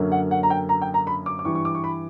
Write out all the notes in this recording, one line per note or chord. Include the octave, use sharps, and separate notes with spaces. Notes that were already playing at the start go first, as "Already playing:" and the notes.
Already playing: F#2 D3 F#3 A#3 C#4
F#5
F#5
A#5
G5
A#5
G5
A#5
B5
D6
D6
G2 E3 G3 C#6
C#6
D6
C#6
B5